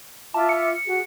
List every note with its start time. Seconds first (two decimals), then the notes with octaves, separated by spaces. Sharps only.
0.34 F4 E5 A5 D6
0.49 C#7
0.85 F#4 G#4